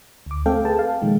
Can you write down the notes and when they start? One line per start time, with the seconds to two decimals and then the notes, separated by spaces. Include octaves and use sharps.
0.26 D2 D6
0.46 A3 C4 A4 F5 G5
0.65 G#4 A4 B4 G5 A5
0.79 F5
1.02 A#2 D#3 F3 G#3